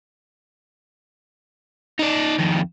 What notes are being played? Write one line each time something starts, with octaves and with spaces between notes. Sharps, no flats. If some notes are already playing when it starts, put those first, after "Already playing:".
D#4 D5
F2 D#3